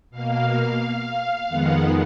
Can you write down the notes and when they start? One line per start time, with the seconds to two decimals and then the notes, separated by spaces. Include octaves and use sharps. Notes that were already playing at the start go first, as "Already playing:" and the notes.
0.10 B2 A#3 F5
1.48 F2 D#3 G#3 B3 F#5